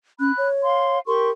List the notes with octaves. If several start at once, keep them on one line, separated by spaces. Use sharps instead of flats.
C#4 B5 F#6
C#5
F5 C6
G4 A#4 C6 C#6